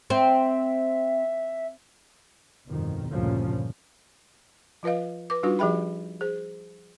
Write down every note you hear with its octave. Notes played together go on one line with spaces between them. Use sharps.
C4 E5
G1 F2 B2 D#3
D2 G2 A#2 C#3 F3 C#4
F3 F4 B4 D#5 F5
B4 D6
G3 D4 D#4 F4 F#4 B4
F3 G4 G#4 E5 G5 B5
G#4 C5